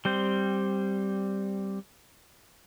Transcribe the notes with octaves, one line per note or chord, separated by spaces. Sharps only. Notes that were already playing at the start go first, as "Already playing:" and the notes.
G3 C4 C5